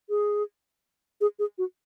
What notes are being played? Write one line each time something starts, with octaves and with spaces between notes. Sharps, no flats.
G#4
G#4
G#4
F#4